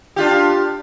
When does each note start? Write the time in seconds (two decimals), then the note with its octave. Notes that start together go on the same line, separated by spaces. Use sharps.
0.16 D4 F4 G4